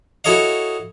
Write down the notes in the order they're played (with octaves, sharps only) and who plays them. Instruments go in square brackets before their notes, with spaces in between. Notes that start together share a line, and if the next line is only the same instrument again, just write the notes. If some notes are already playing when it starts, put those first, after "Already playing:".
[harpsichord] E4 F#4 A4 C#5 D#5 F5